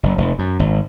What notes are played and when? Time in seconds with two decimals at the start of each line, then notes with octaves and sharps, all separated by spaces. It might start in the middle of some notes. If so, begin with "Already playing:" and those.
0.03 F#1
0.18 F1
0.39 F#2
0.59 G#1